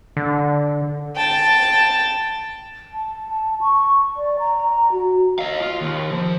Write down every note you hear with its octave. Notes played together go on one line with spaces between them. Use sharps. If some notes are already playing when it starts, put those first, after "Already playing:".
D3
G5 A5
A5
C#6
D5
A#5
A#5
F#4
D#5 F5
F4
D#2
F3